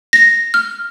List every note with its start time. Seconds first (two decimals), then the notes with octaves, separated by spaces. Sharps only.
0.13 A#6
0.54 F6